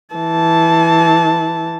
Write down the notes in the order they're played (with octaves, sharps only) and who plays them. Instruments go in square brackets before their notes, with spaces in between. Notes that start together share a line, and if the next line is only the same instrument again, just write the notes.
[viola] E3 A5